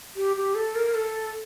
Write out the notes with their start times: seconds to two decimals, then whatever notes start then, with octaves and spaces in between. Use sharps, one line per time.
0.16 G4
0.36 G4
0.55 A4
0.75 A#4
0.94 A4